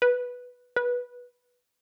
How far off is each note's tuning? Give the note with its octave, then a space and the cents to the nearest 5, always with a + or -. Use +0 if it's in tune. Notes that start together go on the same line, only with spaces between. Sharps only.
B4 +0
B4 -10